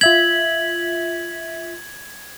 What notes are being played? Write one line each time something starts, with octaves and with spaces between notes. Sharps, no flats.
F4 E5 G#6 B6 F#7